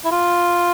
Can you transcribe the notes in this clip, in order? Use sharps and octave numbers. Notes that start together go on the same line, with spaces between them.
E4
F4